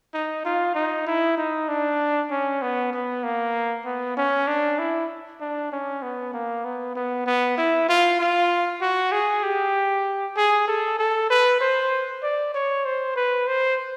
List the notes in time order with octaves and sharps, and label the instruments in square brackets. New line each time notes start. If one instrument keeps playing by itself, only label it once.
[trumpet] D#4
F4
D#4
E4
D#4
D4
C#4
B3
B3
A#3
B3
C#4
D4
E4
D4
C#4
B3
A#3
B3
B3
B3
E4
F4
F4
F#4
G#4
G4
G#4
A4
A4
B4
C5
D5
C#5
C5
B4
C5